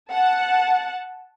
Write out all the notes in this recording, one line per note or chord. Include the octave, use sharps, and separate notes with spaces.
F#5 A5